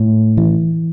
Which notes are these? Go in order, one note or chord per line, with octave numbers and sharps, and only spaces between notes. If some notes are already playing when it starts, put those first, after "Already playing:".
Already playing: A2
E3